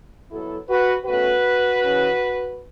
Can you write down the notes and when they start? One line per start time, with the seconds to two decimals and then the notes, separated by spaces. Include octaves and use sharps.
0.30 B2 F#3 B3 E4 A4
0.68 F#4 B4
1.05 B2 A3 C#4 F#4 B4
1.80 C#3 E3 C#4